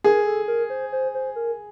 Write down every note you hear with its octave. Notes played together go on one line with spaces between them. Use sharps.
G#4 A#4
A4
A#4
C5
C5
C5
A#4